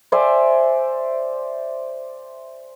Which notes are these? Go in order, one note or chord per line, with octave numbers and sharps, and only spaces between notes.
C5 D5 E5 G#5